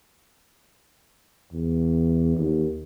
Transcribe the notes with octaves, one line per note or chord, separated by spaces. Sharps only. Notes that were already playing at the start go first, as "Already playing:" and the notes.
E2
D#2